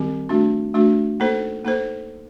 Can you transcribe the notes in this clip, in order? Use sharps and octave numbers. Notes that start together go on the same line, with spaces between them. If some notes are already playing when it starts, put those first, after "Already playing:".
Already playing: D#3 G3 C4 G4
A3 D4 F#4
A3 D4 F#4
A#3 D#4 A4 C5
A#3 D#4 A4 C5